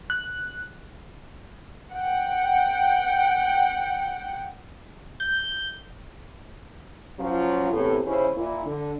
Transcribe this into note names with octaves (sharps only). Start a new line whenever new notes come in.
F#6
F#5 G5
G6
A#2 F3 F#3 C#4 F4
E2 A2 C3
D#2 C#3 C#4 E4 C5
A#2 E4
D3